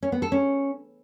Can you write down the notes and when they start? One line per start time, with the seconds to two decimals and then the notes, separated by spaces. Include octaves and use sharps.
0.03 C#4
0.12 B3
0.22 A4
0.32 C#4